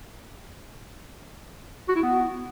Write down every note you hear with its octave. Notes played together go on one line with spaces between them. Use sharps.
F#4
E4
B3